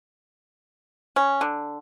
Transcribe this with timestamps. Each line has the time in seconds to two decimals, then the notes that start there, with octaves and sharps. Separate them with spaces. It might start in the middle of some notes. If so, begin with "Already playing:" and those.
1.16 C#4
1.41 D3